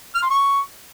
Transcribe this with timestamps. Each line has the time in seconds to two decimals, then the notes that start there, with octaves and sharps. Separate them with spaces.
0.15 F6
0.22 C6
0.30 C#6